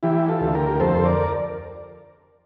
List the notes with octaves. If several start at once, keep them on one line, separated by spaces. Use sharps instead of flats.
E3 E4 G4
F4 A4
D2
G4 A#4
F2 A4 C5
A#4 D5